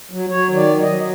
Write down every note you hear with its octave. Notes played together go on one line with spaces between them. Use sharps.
F#3
F#3 C#5
D#3
D5
F#3
D#5
F#3